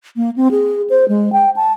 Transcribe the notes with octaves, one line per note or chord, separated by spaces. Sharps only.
A#3
C4
G#4
C5
G#3
G5
A5